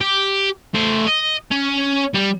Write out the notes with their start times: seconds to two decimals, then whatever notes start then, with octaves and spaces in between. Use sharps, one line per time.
0.01 G4
0.74 A3 C5
1.07 D#5
1.51 C#4
2.14 G3